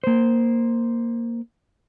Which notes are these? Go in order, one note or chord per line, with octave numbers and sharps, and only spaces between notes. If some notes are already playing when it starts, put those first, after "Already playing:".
A#3 C5